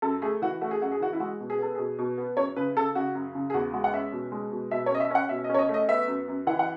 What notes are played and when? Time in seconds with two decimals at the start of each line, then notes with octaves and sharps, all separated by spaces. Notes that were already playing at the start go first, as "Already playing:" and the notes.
0.02 F#2 A4
0.22 A3 G#4
0.42 E3 F#4
0.61 A3 F#4
0.71 G#4
0.81 F#2 F#4
0.92 G#4
1.01 E3 F#4
1.13 E4
1.20 G#3 F#4
1.40 B2
1.50 G#4
1.58 B3 A4
1.75 B2 G#4
1.98 B2
2.18 B3
2.37 F#2 C#5
2.56 C#3 B4
2.77 C#3 A4
2.95 C#3 F#4
3.15 F#2
3.35 C#3
3.50 G#4
3.54 E2 F#4
3.73 G#3 F#4
3.84 F#5
3.93 C#4 E5
4.12 B2
4.32 G#3
4.52 B2
4.71 B2 E5
4.86 C#5
4.91 C#4 D#5
5.00 E5
5.10 C#4 F#5
5.29 B2 E5
5.44 D#5
5.49 C#4
5.54 C#5
5.59 D#5
5.69 A3
5.74 D#5
5.89 B3 E5
6.07 F#2
6.28 F#2
6.47 E3 F#5
6.59 F#5